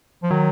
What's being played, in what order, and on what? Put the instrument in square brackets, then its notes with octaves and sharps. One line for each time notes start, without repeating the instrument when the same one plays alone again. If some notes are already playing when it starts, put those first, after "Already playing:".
[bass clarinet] F3
[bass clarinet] D#3 [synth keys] F#3